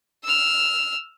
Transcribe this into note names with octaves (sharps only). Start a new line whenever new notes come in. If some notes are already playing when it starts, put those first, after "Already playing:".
E6 F6